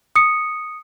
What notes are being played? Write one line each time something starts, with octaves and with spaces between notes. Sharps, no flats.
D#6 C#7